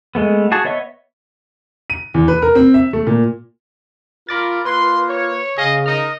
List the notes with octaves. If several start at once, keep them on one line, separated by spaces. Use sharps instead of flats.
G#3 A3 B3
F#4 G#4 A5 C#6
B3 C#5 D#5 E5 C#6
D#7
E2
B4
A#4
C4
E5
A3
A#2
F4 A#4 B5 D6 A6
A#3 F4 B4 C6
C#5
C#3 G#4 D#5 F5
D#4 A#4 D#5 D#6 F6